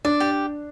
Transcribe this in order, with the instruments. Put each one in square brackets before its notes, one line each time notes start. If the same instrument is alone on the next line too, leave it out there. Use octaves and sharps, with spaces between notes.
[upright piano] D4 [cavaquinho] D5
[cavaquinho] G4